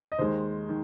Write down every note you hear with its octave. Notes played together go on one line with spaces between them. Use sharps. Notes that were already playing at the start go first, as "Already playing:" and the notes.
D#5
D#2 D#3 G#3 C5
D#3